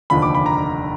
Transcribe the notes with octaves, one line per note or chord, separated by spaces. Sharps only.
F1 D#2 D3 F3 B5
D6
B5
A#5